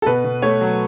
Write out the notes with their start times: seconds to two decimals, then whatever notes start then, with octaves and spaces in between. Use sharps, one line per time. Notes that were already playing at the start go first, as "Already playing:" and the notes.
0.02 A4
0.06 B2 B4
0.24 B2
0.42 A3 C#5
0.61 F#3